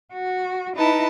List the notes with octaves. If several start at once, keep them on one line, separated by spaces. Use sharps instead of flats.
F#4
D#4 E4 B4 A5 A#5